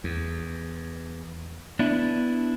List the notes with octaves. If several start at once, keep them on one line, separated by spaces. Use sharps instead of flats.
E2
B3 D4 E4